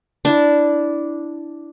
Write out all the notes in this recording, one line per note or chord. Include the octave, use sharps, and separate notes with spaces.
D4 E4